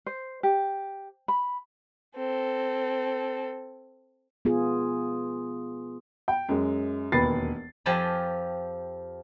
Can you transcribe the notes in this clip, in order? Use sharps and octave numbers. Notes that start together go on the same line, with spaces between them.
C5
G4
B5
C4 A4
B3 F4 G#4
G5
F#2 G#3
E1 D#2 B4 A6 C7
F2 F3 G4 G#5 A5 B5